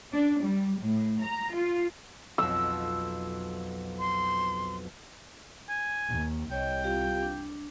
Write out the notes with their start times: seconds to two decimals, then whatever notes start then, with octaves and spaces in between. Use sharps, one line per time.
0.12 D4
0.42 G3
0.80 A2
1.21 A#5
1.54 F4
2.38 B1 F2 E6
4.00 C6
5.69 G#5
6.09 D#2
6.51 C2 C#5 D#5 G5
6.84 F4 G4 F5
7.23 D4